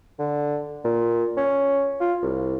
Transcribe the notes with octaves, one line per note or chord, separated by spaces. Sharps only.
D3
A#2
C#4
F4
C2